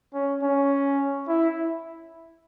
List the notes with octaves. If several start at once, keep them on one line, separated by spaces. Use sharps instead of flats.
C#4
C#4
E4